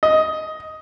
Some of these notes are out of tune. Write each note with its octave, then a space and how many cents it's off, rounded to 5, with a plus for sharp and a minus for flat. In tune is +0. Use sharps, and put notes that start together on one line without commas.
D#5 +10